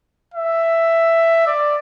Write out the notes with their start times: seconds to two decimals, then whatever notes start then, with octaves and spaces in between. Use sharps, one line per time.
0.34 E5
1.47 D5